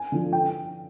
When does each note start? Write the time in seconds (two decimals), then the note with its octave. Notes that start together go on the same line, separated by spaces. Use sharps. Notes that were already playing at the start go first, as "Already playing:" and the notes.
Already playing: G#5
0.12 D3 F3
0.33 G5